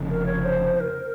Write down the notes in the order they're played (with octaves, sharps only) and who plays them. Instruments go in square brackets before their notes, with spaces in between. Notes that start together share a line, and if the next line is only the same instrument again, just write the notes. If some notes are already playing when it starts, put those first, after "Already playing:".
Already playing: [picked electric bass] F1 F2 C#3
[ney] A#4
C#5
C5
C5
A#4